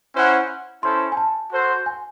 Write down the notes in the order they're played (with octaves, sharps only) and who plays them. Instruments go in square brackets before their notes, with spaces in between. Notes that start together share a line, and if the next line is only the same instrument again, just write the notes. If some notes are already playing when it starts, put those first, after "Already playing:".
[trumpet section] C#4 E4 C5 F#5
[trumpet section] C#4 E4 A4 C5 [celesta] C6
[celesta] G#5
A5
[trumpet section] F#4 A4 C5
[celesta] G#5